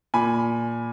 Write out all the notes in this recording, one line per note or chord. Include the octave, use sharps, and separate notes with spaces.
A#2 G#5 B5